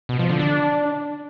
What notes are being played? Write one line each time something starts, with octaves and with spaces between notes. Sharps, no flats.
B2
F3
D3
D4